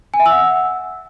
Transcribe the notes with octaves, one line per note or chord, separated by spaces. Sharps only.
G#5
E5
E6
F#5